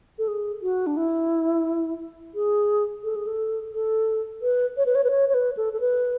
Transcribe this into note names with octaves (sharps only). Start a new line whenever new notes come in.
A4
G#4
F#4
D4
E4
G#4
A4
G#4
A4
A4
B4
C#5
B4
C#5
B4
C#5
C#5
B4
A4
A4
B4